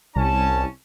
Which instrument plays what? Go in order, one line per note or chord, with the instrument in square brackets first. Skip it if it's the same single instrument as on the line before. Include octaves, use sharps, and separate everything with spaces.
[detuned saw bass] C2 [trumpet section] C#4 A5